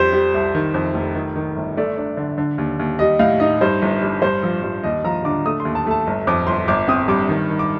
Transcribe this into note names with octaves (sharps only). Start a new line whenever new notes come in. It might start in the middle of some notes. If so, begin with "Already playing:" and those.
Already playing: F2 G3 C5
G3
C2
D#3
F2
F1
D#3
D#3
G1
A3 D5
D4
D3
D3
D#2
D#2
G3 D#5
A2 F5
D#4 D#5
G2 C5
G1
G2
G2 C5
F3
G2
D#2 D#5
F3 A#5
D3 D6
A3 D#6
C6
D#2
A5
A3 A5
G1
F2 D6
G1 C6
G1 D6
C4 D#6
G2 D6
D#3
D#3
D6